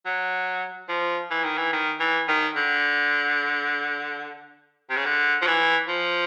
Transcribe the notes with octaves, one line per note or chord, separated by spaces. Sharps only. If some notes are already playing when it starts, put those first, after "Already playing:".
F#3
F3
E3
D#3
E3
D#3
E3
D#3
D3
C3
C#3
D3
F3
E3
F3